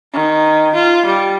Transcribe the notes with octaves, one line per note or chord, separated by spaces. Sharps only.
D#3
F4
G3